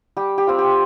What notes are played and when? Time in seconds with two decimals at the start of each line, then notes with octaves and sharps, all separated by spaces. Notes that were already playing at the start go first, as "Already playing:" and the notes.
0.17 G3 G4
0.38 G4
0.47 C4 F4
0.59 G4